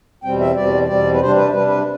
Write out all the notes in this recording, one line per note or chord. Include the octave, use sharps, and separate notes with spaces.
E2 B2 G3 C4 G5
E5
E2 B2 G3 C4 D5
E2 B2 G3 C4 D5
B4
C3 G3 D4 C5
B4
C3 G3 D4 B4
B4